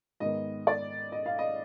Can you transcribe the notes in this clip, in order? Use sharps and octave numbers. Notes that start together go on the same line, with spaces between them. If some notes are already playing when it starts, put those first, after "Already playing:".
G#2 D#3 B3 D#5
D5
D#5
F5
D#5